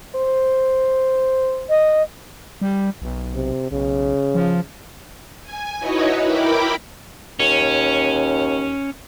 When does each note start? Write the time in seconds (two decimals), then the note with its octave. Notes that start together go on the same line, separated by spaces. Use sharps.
0.16 C5
1.70 D#5
2.61 G3
3.02 B1
3.35 C3
3.72 B1 C#3
4.35 F3
5.42 G#5
5.79 D#4 E4 F#4 B4 C#5 D#5
6.24 E4 A#4 G5 B5 D6
7.40 D#2 C#4